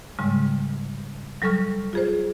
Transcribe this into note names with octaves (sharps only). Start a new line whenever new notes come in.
G#2 C#3 G3 G#3
F#3 G3 A4 C#6 F6
F4 G#4 C5